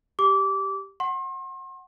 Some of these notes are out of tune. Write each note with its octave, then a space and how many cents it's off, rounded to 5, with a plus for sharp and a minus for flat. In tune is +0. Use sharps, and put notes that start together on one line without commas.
G4 +0 D6 -20
F#5 +0 C6 +40